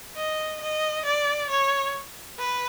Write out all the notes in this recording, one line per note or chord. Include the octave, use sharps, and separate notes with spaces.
D#5
D#5
D5
C#5
B4